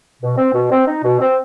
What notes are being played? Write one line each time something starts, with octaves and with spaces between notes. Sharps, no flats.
B2
C4
B2
C4
D#4
B2
C4